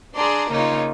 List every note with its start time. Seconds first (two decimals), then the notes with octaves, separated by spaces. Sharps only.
0.16 D4 G#4 D5 A#5 C6
0.51 C#3 A#3 D#4 F4 C#5